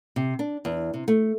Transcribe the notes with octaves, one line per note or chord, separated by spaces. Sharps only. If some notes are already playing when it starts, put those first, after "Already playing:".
C3
D4
E2
C3
A3